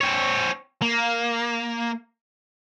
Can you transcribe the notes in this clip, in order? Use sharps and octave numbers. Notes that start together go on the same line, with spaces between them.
C4 C#5
A#3